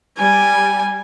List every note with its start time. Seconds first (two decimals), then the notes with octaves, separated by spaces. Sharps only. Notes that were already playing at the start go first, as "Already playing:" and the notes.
0.18 G3 G#5